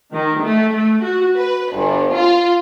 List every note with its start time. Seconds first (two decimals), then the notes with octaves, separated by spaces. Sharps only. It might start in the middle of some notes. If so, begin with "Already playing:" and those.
0.13 D#3
0.42 A3
0.72 A3
1.03 F#4
1.38 B4
1.74 G1
2.16 F4